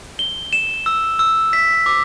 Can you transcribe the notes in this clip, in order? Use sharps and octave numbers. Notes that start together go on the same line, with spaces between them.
G7
E7
E6
E6
B6
D6